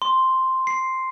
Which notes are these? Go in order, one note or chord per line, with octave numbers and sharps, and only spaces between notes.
C6
C7